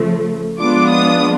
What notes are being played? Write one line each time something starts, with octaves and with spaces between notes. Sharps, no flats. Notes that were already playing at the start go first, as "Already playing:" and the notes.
Already playing: C#3 F3 A3
F3 G#3 B3 D4 F4 D6
D#6